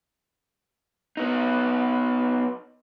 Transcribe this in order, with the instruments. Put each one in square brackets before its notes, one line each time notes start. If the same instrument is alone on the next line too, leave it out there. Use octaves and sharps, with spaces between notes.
[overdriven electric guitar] B3 D#4